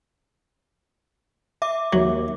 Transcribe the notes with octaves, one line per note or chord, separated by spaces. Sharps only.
E5 D6
D#2 F#3